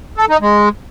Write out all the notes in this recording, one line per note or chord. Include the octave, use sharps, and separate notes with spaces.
A4
D#4
G#3